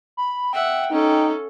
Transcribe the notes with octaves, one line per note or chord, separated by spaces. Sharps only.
B5
E5 F#5 G5
C#4 D#4 A4